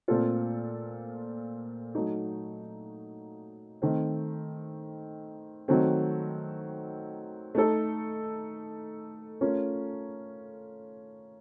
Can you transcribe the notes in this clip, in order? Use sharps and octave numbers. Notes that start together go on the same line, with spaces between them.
A#2 A3 C4 F4 A4
F#3 A3 D#4
D#3 A3 C4
D#3 F#3 A3 C4
A3 D#4 A4
A3 C#4 F4 A#4 C#5